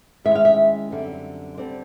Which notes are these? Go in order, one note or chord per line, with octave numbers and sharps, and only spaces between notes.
G#2 D#3 G#3 C#4 E4 E5
F5
E5
F#2 D3 G3 C4
D3 G3 C4 D5